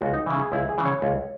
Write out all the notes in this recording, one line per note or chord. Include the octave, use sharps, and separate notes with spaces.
C#2 F#4
D#4
C#3 E3 E4
G#4
C#2 E4
G#4
C#3 E3
C#5
C#2